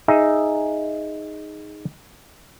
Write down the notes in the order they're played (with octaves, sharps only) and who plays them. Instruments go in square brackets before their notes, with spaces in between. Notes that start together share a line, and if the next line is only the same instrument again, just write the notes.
[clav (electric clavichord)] D#4 G#4 E5